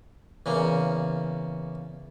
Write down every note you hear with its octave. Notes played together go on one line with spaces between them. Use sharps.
E2 C#3 A#3